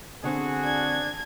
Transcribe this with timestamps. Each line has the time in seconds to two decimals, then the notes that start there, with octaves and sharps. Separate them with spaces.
0.24 D3 C4 F#4 G#4
0.64 D4 G#6